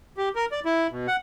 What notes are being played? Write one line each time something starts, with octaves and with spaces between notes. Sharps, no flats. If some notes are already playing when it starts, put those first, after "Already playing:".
G4
A#4
D5
E4
B2
F#5